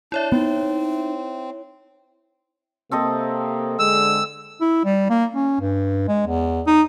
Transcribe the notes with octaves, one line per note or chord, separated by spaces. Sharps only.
D4 E4 C#5 E5
B3 C4 D#4
C3 A#3 C4 A4 D#5
D3 G#3 E6
E4
G3
A#3
C#4
G2
G#3
E2
D#4